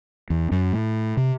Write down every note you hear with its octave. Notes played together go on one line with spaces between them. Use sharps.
E2
F#2
A2
C3